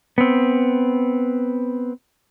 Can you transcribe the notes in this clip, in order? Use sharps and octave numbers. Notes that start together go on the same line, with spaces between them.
B3 C4